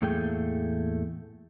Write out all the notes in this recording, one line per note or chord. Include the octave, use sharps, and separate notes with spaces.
E2 A2 A3 A#3 G#4 G5